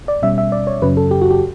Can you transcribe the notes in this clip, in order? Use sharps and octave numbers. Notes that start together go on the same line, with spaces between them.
D5
B2 G3 C#4 E5
E5
D5
C#5
F#2 C#3 F#3 C#4 B4
A4
G4
F#4
G4